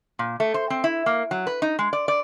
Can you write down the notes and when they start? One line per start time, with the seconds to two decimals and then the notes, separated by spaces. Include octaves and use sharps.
0.19 A#2
0.40 A3
0.54 C5
0.70 C4
0.84 E4
1.06 A#3
1.31 F#3
1.47 B4
1.62 D#4
1.79 G#3
1.93 D5
2.08 D5